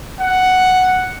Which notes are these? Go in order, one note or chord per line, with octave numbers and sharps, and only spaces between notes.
F#5